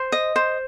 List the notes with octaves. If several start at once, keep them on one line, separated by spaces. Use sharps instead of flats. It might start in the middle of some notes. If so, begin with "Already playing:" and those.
Already playing: C5
D#5
C5